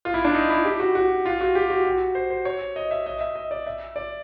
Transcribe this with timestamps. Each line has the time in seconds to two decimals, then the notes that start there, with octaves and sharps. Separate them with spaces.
0.05 F4
0.14 E4
0.25 D4
0.35 D#4
0.50 E4
0.65 G4
0.80 F#4
0.95 F#4
1.26 F4
1.41 F#4
1.55 G4
1.70 F#4
1.85 F#4
2.15 C5
2.30 C5
2.45 C#5
2.76 D#5
2.91 E5
3.06 D#5
3.21 E5
3.36 D#5
3.51 D5
3.66 E5
3.96 D5